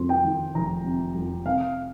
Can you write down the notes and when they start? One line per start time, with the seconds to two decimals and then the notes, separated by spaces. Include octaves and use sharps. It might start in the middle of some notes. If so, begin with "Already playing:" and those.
Already playing: F2 C3 C6
0.09 G5
0.24 D#3
0.55 F1 A#5
0.84 C3
1.15 F2
1.46 C3 F5